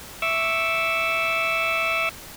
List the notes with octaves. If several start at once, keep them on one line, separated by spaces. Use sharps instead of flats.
E5 C#6 D6 E6